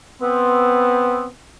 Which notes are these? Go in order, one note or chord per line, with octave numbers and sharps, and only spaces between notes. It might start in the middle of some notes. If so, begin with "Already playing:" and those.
B3 C4